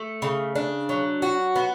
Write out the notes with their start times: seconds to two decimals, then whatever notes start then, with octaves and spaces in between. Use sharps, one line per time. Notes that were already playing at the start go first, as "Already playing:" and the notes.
Already playing: A3
0.22 C#3
0.55 D4
0.89 F#3
1.22 F#4
1.56 B3